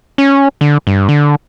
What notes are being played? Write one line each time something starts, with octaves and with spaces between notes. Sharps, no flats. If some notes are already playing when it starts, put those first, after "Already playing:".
C#4
D3
G2
D3